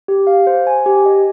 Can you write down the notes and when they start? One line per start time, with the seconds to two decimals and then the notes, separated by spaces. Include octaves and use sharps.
0.08 G4
0.27 F5
0.47 C5
0.67 G#5
0.86 G4
1.06 D#5